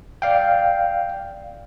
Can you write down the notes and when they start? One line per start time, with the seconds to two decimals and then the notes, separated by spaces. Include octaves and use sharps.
0.22 D5 F5 G5